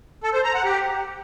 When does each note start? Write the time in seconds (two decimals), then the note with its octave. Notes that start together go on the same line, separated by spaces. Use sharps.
0.24 A4
0.34 C5
0.44 A#5
0.54 F#5
0.64 G4